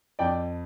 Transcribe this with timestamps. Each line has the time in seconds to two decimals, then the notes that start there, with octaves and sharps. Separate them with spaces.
0.19 F2 D5 G5